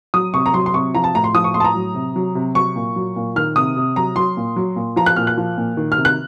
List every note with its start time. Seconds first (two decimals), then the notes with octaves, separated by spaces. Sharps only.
0.14 F#3 D#6
0.34 C3 C#6
0.46 A#5
0.54 F#3 C6
0.66 C6
0.74 C3 C#6
0.95 F3 A#5
1.04 A5
1.15 A2 A#5
1.24 C6
1.35 F3 D#6
1.44 C#6
1.54 A2 C6
1.60 A5
1.65 A#5
1.75 F#3
1.94 C3
2.16 F#3
2.35 C3
2.55 F#3 C#6
2.76 A#2
2.96 F#3
3.16 A#2
3.36 D#3 F6
3.56 C3 D#6
3.77 C3
3.96 F#3 A#5
4.16 F#3 C6
4.37 A#2
4.56 F#3
4.76 A#2
4.96 F3 A#5
5.06 F#6
5.16 A#2 F6
5.27 F#6
5.37 F3
5.58 A#2
5.77 D#3
5.92 F6
5.97 C3
6.05 F#6